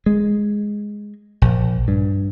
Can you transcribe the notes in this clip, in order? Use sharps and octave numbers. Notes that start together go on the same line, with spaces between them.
G#3
A#1
G2